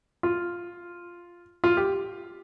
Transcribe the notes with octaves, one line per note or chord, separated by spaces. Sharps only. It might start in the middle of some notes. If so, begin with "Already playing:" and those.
F4
F4
G4